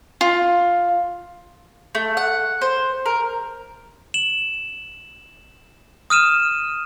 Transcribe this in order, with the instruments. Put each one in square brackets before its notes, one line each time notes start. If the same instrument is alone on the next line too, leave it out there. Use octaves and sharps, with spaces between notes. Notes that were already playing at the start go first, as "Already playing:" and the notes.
[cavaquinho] F4
[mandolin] A3
F#5
C5
A#4
[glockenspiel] E7 F#7
D#6 F6 D#7 E7